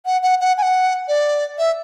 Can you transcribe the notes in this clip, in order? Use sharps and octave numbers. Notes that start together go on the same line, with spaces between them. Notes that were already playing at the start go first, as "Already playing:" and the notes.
F#5
F#5
F#5
G#5
F#5
D5
E5